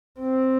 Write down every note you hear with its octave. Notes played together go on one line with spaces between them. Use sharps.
C4